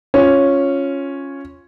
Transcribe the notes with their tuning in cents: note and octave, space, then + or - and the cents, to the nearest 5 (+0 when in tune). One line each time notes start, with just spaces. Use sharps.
C#4 -5 F4 +0